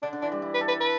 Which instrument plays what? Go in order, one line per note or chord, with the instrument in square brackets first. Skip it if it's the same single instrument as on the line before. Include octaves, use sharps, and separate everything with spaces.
[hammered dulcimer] D3 [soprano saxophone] D4
[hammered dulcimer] D3
[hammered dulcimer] E3 [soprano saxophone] D4
[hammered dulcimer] G3
E4
[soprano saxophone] B4
[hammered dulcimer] A4
[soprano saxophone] B4
B4